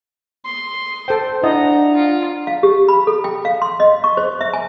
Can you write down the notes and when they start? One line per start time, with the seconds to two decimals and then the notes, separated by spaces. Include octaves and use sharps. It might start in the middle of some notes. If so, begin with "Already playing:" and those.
0.45 C6
1.08 A4 C5 G5
1.43 D4 E4 D#5 F#5 A#5
1.96 F4
2.47 F5
2.63 G4
2.88 B5
3.07 A4
3.24 G5
3.45 F5
3.62 C6
3.80 D#5
4.04 C#6
4.17 C5
4.41 E5
4.54 G#5